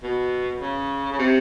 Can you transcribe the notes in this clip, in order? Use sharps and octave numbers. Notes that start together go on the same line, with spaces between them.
B2
C#3
C#3
C3